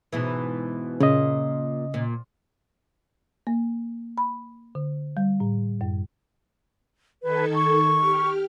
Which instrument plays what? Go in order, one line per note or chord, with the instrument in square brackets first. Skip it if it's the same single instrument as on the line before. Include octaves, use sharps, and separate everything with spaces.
[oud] G#2 B2 E3
[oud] A#2 [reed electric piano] C#3 D#5
[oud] A#2
[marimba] A#3
B5
D3
G3
A2
F#2
[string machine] D#3 A4 G#6 [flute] B4
[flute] C#6
[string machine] G4 F6